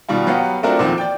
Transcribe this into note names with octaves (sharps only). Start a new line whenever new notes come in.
B2 D#3 G3 F4
F#3 B3 G4 F5 F#5
A3 C4 D4 F4 F#4 A#4
E2 A#2 D#3 F3 C4
D5 G5